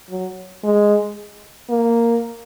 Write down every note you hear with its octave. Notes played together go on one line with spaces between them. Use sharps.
F#3
G#3
A#3